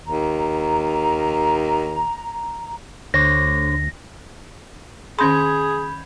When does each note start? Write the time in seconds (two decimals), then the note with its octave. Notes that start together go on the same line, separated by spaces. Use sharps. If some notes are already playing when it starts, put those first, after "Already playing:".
0.05 D#2 A#5
3.14 D2 D3 C5 C#5 A#6
5.19 D#3 C#4 G#4 B5 C6 G6 G#6